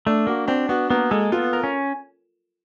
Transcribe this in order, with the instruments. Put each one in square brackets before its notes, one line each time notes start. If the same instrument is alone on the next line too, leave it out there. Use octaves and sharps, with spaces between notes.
[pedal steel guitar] A3 [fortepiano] D4
[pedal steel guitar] A#3 [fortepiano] F#4
[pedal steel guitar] C4 [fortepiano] D4
[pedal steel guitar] B3 [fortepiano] F#4
[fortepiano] A#3 [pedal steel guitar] B3
[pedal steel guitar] G#3 [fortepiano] A4
[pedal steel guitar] B3 [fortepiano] F4
[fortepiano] A#4
[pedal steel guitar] C#4